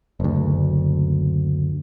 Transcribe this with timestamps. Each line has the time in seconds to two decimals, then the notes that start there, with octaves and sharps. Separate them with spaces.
0.20 F#1 D2